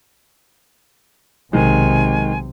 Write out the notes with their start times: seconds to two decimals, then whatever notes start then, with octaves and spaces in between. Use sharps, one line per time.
1.53 B1 C3 D#3 G#3 G#5